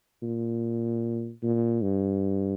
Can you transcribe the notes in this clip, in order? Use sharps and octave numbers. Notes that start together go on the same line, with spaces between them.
A#2
A#2
G2